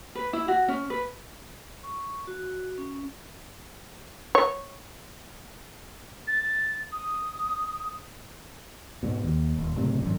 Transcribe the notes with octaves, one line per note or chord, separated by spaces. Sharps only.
B4
E4
F#4
C#4
B4
C#6
F#4
C#4
C#5
A6
D#6
G#2 B2
D#2
D#1
F#1 A2 C3
G#1 F#2